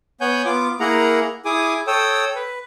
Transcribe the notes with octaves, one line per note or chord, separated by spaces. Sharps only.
B3 C#5 F#5 G#5 G6
B3 F4 D6
A#3 E4 G#4 A#4 F#5 A#5
E4 G#4 G#5 D6 D#6
A4 C#5 G5 D#6 E6
B4